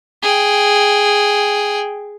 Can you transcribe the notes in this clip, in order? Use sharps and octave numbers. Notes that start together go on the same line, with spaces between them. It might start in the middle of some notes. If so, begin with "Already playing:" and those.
G#4 G5